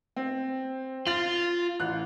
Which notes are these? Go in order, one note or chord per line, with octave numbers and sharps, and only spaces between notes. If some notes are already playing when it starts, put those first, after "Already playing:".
C4
F4 A6 F#7
A1 F#6